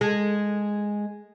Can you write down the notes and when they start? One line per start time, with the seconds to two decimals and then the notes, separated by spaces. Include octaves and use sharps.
0.01 G#3